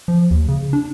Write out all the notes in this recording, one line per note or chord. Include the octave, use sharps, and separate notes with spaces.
F3
D#2
C#3
D4